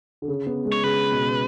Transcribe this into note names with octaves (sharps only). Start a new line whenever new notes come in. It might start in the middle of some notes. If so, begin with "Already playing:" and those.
D3
C#3
B3
G#3
C#5
C#3 B4
B2